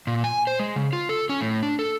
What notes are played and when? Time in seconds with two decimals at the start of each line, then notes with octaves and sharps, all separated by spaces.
0.07 A#2
0.24 G#5
0.47 C5
0.59 G#3
0.76 C#3
0.93 F4
1.09 A4
1.29 C#4
1.41 A2
1.63 D4
1.79 A4